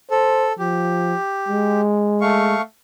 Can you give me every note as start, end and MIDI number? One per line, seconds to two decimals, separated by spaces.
0.11 0.53 69
0.11 0.50 72
0.59 1.14 53
0.59 1.81 67
1.48 2.55 56
2.21 2.61 57
2.21 2.61 77
2.21 2.61 85